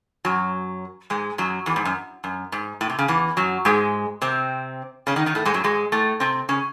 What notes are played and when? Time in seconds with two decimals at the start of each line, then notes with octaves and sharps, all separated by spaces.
0.25 F#2 F#3
1.10 G#2 G#3
1.38 F#2 F#3
1.66 E2 E3
1.76 G#2
1.85 F#2
2.24 F#2
2.52 G#2
2.81 A2
2.90 C3
2.99 C#3
3.08 E2 E3
3.37 F#2 F#3
3.65 G#2 G#3
4.22 C3 C4
5.07 C#3 C#4
5.16 D#3 D#4
5.26 D#3 D#4
5.35 A2 A3
5.45 G#2 G#3
5.54 F#2 F#3
5.64 G#2 G#3
5.92 A2 A3
6.20 C3 C4
6.49 C#3 C#4